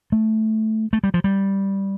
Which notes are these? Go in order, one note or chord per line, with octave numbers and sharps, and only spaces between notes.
A3
A3
G3
F3
G3